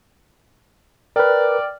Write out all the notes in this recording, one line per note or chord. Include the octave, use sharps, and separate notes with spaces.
A#4 B4 D5 G5 F6